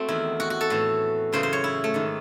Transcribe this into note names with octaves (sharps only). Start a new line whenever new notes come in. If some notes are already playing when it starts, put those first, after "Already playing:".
Already playing: A3 C4 F#4
E2 D#3 E4
F#4
F#4
A4
A2 E3
F#2 C#3 E3 C5
C5
C#5
E4
A3
G#2 D#3